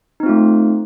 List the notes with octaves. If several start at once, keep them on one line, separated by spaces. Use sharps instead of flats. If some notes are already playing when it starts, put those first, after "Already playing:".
A3 C4 D#4 F4